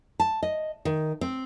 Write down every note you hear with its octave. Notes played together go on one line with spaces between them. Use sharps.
A5
D#5
D#3
C4